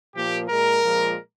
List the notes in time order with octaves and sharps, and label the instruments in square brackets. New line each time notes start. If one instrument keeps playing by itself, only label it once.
[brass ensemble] A#2 F3 A#3 G4
A#2 G#3 A#4
A#2 F3 G#3